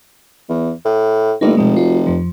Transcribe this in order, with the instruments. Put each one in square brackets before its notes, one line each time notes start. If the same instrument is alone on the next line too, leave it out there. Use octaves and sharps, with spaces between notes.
[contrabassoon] E2
A2
[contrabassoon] G1 [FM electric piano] A3 A#3 D#4
[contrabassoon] F1 [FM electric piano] B2 G#3
[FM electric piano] F4 F#4
F2 F3